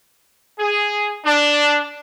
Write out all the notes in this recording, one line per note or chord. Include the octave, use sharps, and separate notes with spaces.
G#4
D4